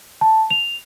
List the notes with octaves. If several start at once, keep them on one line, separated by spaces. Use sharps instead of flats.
A5
F7